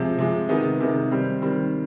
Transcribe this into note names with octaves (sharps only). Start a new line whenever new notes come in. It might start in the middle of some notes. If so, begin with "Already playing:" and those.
Already playing: C3 F3 G#3
C3 F3 G#3
C3 D#3 G#3 B3 D#4
C3 D#3 G#3 B3 D#4
D#3 G3 C4
D#3 G3 C4